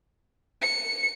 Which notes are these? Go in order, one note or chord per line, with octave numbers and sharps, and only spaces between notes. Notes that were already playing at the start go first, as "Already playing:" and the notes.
C#7